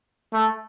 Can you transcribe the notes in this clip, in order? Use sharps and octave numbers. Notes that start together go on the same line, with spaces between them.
A3